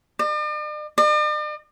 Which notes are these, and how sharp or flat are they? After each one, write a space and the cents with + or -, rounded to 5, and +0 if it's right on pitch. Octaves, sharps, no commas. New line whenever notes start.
D5 +45
D5 +45